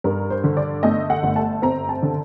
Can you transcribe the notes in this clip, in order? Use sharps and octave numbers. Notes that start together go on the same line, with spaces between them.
G2 A#4
C5
D3
D5
A3 D#5
F#5
G1
A5
C4 A#5
A5
D3